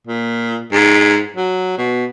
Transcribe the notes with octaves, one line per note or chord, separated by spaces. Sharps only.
A#2
G#2
F#3
B2